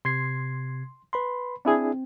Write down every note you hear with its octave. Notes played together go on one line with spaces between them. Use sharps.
C3 C6 G#6 C7
B4 B5 C6
C4 D4 E4 G#4